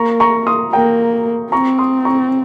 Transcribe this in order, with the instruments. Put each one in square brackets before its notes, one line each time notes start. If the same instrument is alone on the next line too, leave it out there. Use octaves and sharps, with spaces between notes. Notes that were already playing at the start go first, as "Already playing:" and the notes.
Already playing: [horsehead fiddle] A#3 [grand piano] A#5 C#6
[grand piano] A#5 C#6
C6 D#6
[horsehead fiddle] A#3 [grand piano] G5 A#5
[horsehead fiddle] C4 [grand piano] A#5 C#6
[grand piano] C6 D#6
A#5 C#6